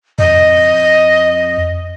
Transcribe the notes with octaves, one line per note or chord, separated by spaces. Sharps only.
F2 D#5